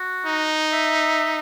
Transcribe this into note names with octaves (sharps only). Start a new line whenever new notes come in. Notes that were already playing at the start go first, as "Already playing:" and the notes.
Already playing: F#4
D#4
E5